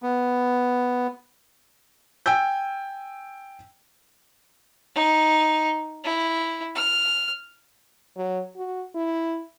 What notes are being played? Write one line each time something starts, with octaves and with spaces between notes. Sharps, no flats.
B3
G5 G#5 E6 G6
D#4
E4
F6
F#3
F#4
E4